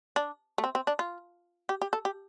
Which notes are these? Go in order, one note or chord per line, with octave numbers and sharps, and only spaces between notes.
D4
A3
C4
C4
D4
F4
G4
G4
A4
G4